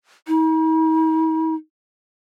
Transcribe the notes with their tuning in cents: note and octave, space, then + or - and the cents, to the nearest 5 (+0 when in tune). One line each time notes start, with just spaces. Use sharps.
D#4 +45